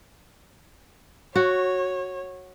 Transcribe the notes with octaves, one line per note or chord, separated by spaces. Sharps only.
F#4 C#5